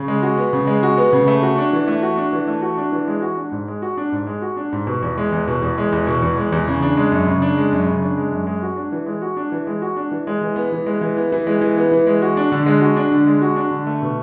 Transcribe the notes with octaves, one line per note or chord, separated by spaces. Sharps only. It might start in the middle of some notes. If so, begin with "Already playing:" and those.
Already playing: C#3
G#3
F#4
B3
C#3
G#3
F#4
B3
C#3
A3
F#4
D4
E3
A3
F#4
D4
E3
A3
F#4
D4
E3
G#3
F#4
D4
G#2
G#3
F#4
D4
G#2
G#3
F#4
D4
G#2
B2
E2
G#3
E2
B2
E2
G#3
E2
B2
E2
G#3
E2
C#3
D4
G#3
F#2
C#3
D4
G#3
F#2
C#3
D4
G#3
F#2
G#3
F#4
D4
E3
G#3
F#4
D4
E3
G#3
F#4
D4
E3
G#3
E3
B3
E3
G#3
E3
B3
E3
G#3
E3
B3
E3
G#3
F#4
D4
D3
G#3
F#4
D4
D3
G#3
F#4
D4
D3
A3
B2